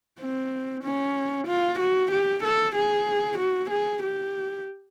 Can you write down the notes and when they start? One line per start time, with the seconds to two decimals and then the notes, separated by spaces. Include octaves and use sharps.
0.20 C4
0.83 C#4
1.47 F4
1.79 F#4
2.11 G4
2.43 A4
2.76 G#4
3.38 F#4
3.70 G#4
4.03 G4